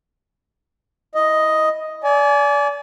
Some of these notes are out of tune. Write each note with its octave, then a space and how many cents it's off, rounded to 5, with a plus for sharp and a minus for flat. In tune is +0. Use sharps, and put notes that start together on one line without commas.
E4 -10 D#5 +5
D5 -30 G#5 +20